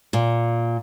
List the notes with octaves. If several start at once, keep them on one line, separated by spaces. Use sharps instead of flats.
A#2